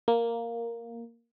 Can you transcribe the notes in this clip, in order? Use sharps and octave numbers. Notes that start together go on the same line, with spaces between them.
A#3